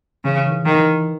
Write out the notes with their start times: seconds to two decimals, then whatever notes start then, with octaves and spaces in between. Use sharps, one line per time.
0.24 C#3 E3
0.47 D#3
0.52 E3
0.65 D#3
0.79 E3